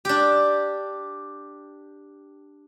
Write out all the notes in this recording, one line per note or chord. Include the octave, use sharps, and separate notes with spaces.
D4 G4